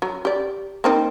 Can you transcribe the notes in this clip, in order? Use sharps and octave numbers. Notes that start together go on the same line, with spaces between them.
F#3
G4 D5
A#3 C4 D#4